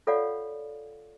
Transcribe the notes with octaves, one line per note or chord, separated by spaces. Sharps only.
F4 A4 C#5 D5 F5 F#5